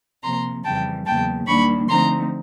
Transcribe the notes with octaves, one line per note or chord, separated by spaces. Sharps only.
C3 F3 A#3 A#5 C6
F2 C#3 E3 G3 G5 A5
E2 C#3 F#3 A#3 G5 A5
D#2 D#3 G3 A#3 D4 B5 C#6
D3 F3 A3 C4 D#4 A#5 C6